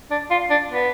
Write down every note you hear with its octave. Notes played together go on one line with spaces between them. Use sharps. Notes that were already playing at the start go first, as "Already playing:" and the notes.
D4
F4
D4
B3